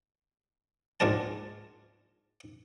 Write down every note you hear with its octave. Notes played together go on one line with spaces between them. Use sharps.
C#2 G#2 G#3 D4 A#4 A5